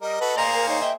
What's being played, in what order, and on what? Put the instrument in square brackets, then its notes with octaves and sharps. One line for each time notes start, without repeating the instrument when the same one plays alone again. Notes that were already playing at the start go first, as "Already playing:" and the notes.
[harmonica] G3 A#4 [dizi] D#5
[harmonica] F#4 A4 [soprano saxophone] B4
[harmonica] A#3 G#4 C5 [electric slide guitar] D5 F5 [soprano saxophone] A#5
[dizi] A#4
[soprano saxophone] D#4 [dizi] C#5
[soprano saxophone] D#5 [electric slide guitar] E5 [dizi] G5